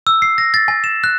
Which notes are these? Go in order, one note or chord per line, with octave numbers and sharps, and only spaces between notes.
E6
C7
A#6
A6
G#5
E7
F#6